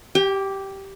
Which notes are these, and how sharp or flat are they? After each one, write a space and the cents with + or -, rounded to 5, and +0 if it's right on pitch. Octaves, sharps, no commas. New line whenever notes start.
G4 -10 G5 +35